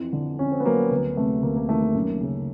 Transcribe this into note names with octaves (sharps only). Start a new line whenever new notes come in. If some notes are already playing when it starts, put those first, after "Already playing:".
Already playing: F2 E3
D3
F2 C#4
C4
B3
F#3 A#3
D2 B3
C3 A3
D2 A#3
A#3
D#3 A3
A#3
F#2
C#3